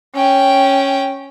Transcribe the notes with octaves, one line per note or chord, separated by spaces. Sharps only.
C#4 G5